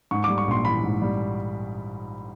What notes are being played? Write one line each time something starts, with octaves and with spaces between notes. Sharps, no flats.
G#2 C#6
G3 D6
C#6
A#1 C6
E3 B5
G#2
G3